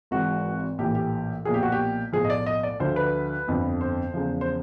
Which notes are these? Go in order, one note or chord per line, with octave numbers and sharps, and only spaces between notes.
G#1 G#2 E3 F#4
A#1 A2 E3 G4
G4
B1 A#2 F3 G#4
G4
F#4
G4
B1 A2 F3 G#4
D#5
D5
D#5
D5
D2 D3 F3 C5
B4
G1 F2 D3 F3
C5
E2 C#3 F3
C5